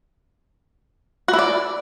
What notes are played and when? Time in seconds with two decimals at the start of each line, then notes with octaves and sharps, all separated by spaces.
1.28 F#4
1.33 E4
1.39 D5